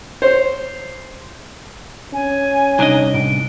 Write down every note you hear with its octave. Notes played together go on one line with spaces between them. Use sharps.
C5 C#5
C#4 G#5
C2 D4 D#4 D#5
A2 D7